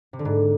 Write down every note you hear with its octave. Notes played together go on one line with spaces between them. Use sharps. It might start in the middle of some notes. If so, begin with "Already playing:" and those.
C3
D3
G#2